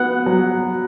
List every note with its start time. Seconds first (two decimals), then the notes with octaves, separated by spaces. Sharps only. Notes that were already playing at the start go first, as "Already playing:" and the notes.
Already playing: B3 F#5
0.26 F#3